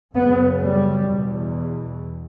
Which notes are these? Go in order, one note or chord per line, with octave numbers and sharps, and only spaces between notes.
F#2 C#3 B3
G3
E2 B2